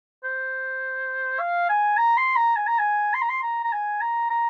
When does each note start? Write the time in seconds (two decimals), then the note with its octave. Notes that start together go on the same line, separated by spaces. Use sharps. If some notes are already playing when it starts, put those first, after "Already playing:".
0.24 C5
1.40 F5
1.69 G#5
1.97 A#5
2.17 C6
2.36 A#5
2.56 G#5
2.67 A#5
2.79 G#5
3.14 C6
3.22 A#5
3.29 C6
3.43 A#5
3.64 A#5
3.72 G#5
4.01 A#5
4.30 A#5